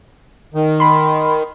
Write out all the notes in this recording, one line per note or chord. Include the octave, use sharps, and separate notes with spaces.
D#3
B5 C6